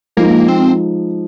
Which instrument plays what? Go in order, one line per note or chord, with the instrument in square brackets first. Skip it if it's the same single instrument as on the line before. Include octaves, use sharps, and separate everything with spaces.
[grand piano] F3 G#3 D#4 [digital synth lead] A#3
[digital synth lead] C4